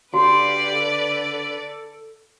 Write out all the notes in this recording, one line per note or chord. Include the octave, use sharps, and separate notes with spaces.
D3 F#4 G4 B4 D5 F5 B5
A4